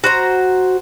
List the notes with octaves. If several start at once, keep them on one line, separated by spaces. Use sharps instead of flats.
F#4 C5 A#5